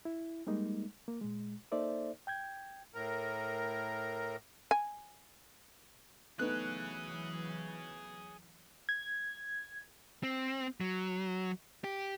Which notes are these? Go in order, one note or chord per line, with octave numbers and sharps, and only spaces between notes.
E4
G3 G#3 A#3 D#4
A#3
A#2 G#3
A#3 D#4 A4 C5 D5 E5
G5 G6 G#6
A2 A#4
G#5
E3 F#3 A3 B3 D#4 G#4 C#5 F#6
G#6
C4
F#3
G4